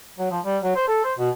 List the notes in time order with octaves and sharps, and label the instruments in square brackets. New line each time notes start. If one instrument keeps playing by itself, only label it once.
[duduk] F#3
F3
G3
F#3
C5
A4
C5
B2